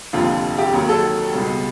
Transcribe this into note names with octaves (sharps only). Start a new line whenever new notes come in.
F1 D#2 D3 F3 F4
G4
D#2 D#3 F#3
A4
C#2 B2 G3